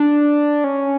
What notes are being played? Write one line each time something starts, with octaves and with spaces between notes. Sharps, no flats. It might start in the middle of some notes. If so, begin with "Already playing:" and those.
Already playing: D4
C#4